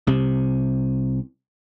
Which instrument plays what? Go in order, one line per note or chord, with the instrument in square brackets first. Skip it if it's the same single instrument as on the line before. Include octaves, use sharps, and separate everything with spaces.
[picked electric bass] C2 C3